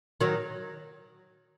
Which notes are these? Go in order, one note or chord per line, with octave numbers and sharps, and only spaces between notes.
D#3 F#3